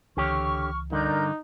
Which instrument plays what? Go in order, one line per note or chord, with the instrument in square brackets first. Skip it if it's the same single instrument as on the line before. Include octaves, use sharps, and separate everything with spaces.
[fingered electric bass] C#2 E3 [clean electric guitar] D3 G4 C#5 [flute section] C#6 F6
[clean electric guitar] G2 D3 [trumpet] D#4 [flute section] A#4 D5 G6